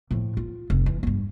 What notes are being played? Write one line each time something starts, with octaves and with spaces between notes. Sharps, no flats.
A2 F3
F4
F1
E3
G2 C4